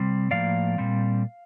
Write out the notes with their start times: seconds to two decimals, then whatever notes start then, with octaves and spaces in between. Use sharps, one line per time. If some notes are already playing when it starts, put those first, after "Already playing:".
Already playing: C3 G3 C4
0.31 A2 F3 A#3 D5 F5
0.78 A#2 G3 C4